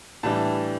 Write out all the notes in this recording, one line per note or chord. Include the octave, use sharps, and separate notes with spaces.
A2 E3 G3 D4 A5